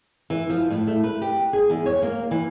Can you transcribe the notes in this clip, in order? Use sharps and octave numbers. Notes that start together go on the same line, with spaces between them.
E3
F3
A2
A3
B4
G4
G#4
E2
C#5
A#3
E3